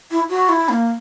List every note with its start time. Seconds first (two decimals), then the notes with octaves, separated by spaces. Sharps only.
0.11 E4
0.30 F#4
0.49 E4
0.69 A#3